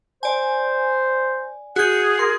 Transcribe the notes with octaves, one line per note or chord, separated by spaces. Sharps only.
C5 D5 G#5
F#4 G#4 F#5 G6
A#4 C6